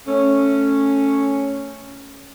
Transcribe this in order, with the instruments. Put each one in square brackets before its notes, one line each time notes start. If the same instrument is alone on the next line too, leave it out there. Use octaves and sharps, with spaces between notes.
[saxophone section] A3 C#4